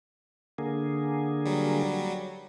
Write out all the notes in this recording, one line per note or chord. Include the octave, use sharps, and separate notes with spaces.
D3 A#3 G#4
F#3 G3